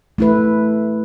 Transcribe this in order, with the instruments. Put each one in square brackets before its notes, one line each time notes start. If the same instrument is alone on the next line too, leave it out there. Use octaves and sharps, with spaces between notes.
[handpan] A3 E4 B4